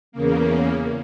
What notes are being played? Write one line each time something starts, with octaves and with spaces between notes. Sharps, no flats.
E2 C#3 A#3